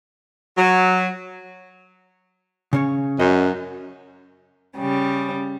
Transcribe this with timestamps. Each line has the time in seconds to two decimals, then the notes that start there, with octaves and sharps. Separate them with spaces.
0.58 F#3
2.73 C#3 C#4 C#5
3.19 F#2 C#4 D#5
4.77 C#3 G3